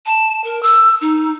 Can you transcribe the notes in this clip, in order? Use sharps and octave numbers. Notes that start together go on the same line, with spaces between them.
A5
A#4
E6
D#4